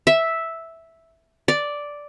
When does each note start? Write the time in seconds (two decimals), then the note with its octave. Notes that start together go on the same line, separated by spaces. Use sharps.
0.07 E5
1.48 D5